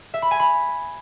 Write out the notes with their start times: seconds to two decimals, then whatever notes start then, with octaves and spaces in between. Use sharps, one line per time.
0.14 E5
0.22 B5
0.31 G#5
0.40 B5